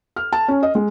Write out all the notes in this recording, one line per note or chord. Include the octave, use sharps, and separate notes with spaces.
F6
A5
C#4
D#5
G#3